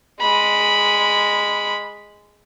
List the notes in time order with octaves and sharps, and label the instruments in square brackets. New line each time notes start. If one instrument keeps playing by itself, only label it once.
[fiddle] G#3 B5